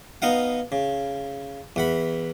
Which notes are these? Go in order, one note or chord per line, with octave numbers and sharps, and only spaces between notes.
B3 D#4 F5 F#5
C#3
E2 F#5 B5